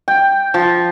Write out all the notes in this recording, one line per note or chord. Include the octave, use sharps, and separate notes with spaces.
G5
F3